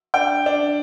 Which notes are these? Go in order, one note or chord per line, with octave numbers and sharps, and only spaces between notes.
D4 G5
D4